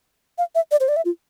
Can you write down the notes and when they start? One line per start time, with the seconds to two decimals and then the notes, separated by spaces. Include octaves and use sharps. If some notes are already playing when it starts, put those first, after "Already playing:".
0.38 F5
0.55 E5
0.71 D5
0.80 C5
0.88 D5
0.96 E5
1.05 F4